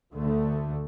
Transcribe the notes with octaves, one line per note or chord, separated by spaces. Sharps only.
D2 D3 A3